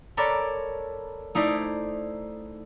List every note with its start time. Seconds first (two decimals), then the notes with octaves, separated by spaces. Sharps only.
0.17 A4 A#4 C#5 D5 B5
1.35 A3 D#4 E4 C5 D5